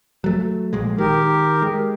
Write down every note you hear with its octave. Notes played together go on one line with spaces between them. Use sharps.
F#3 A3
A#1 A#2 G#3
D#3 G4 A#4
G#3